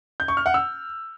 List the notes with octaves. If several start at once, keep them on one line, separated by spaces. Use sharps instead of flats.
G6
C#6
F6
F#5
E6